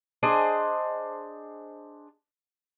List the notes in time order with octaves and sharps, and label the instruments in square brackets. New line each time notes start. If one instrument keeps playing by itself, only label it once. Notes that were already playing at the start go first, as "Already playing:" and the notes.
[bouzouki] D4 G#4 C5 D#5